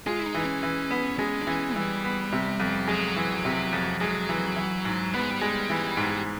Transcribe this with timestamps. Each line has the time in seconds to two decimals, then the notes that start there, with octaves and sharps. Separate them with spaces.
0.06 G#3 F4
0.19 E4
0.26 D#4
0.35 E3
0.44 C#4
0.63 E3
0.91 B3
1.19 G#3 C#4
1.42 D4
1.47 E3 C#4
1.76 E3 G3
2.04 B3
2.32 C3
2.60 F2
2.88 F#3 G#3
3.16 E3
3.45 C3
3.73 F2
4.00 F#3 G#3
4.29 E3
4.56 E3
4.85 G#2
5.13 G3 B3
5.22 G#3
5.31 G3
5.41 G#3
5.70 E3
5.97 G#2